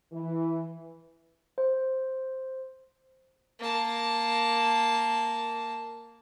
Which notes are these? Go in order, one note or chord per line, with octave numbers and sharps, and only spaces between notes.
E3
C5
A#3 A5